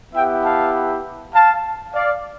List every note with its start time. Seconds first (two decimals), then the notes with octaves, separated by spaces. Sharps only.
0.14 B3 E4 G4 E5 G5
0.43 F5 A5
1.34 F5 A5
1.93 D5 F5